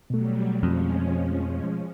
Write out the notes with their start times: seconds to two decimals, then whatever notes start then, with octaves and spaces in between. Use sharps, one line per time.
0.10 B2 F#3 G3 A3
0.63 F2 F3 G#3 C#4